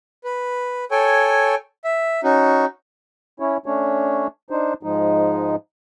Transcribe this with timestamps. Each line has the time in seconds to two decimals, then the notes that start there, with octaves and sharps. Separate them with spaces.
0.24 B4
0.91 A4 C#5 G5 G#5
1.84 E5
2.24 C#4 D#4 F#4
3.40 C#4 E4 C#5
3.66 A3 C#4 D4 C#5
4.51 D4 D#4 C5
4.83 G#2 F3 G#3 D#4